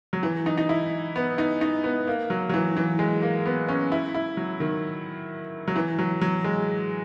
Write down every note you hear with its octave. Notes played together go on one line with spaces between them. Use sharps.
F#3
E3
D#4
D#4
E4
B3
D#4
D#4
B3
A#3
F#3
F#3
E3
E3
G#3
A#3
B3
C#4
E4
E4
F#3
D#3
F#3
E3
F#3
F#3
G#3